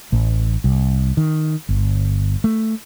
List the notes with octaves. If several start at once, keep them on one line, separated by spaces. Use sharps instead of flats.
A1
C2
D#3
G1
A3